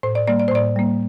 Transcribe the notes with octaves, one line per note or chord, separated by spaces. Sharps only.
A2 C5
D5
G3 A#3 D5
D5
C5
A2 D5
G3 A#3